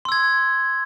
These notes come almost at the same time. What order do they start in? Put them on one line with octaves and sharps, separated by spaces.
C6 E6 G#6